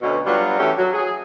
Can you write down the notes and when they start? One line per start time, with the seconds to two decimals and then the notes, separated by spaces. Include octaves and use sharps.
0.02 D2 B2 C#4
0.26 F#3 G3 B3 D4 F4 F#4
0.59 E3 A3 C#4 F#4 G4 E5
0.78 F#3
0.93 G#4